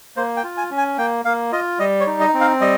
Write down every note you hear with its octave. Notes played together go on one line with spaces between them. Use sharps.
A#3 C5
G5
F4
G#5
C#4
G#5
A#3 G5
A#3 F5
F4 D#5
G3 D#5
C#5
D#4
D#5
C4
F5
G3 D#5